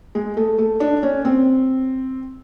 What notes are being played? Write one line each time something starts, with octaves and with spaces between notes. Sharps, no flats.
G#3
A3
A3
D4
C#4
C4